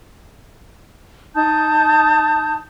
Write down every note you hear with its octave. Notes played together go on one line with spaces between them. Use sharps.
D#4 A5 D#6 G6